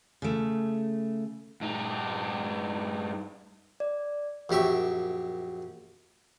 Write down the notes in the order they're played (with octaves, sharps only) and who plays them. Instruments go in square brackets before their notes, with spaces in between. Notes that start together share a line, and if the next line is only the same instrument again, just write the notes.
[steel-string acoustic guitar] C#3 A3
[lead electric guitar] G2 D#4
[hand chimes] D5
[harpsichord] A#1 F#2 G4 E5 C#6